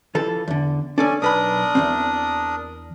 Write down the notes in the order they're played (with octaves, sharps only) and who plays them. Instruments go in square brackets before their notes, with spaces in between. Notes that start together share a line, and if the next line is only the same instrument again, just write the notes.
[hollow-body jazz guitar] E3 F3 A4
E2 D3
[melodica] C#4 G#5 [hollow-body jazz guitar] D4 A4 D5
[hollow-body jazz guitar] B1 B4 B5 [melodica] D4 A#4 D#6
[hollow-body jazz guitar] E2 G#2 C4